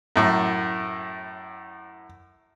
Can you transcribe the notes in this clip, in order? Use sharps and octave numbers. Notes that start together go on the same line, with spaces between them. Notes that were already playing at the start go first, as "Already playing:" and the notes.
F#2 A2